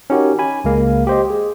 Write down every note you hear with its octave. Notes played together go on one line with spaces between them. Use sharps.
C#4 D#4 F#4 G4 A#4
G#5 B5
C#2 G#3 A#3 F5
G4 C5 D#5
G#4